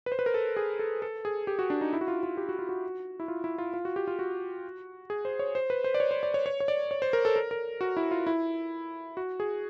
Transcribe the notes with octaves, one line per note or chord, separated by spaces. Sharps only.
B4
C5
B4
A#4
A4
G#4
A4
A4
G#4
G4
F#4
D4
D#4
E4
F#4
F4
F4
G4
F#4
F4
F#4
E4
F4
E4
F4
F4
F#4
G4
F4
F#4
G#4
C5
C#5
C5
B4
C5
D5
C#5
C5
D5
C#5
C#5
C#5
D5
C#5
C5
A#4
A4
A#4
A#4
F#4
E4
F4
E4
F#4
G#4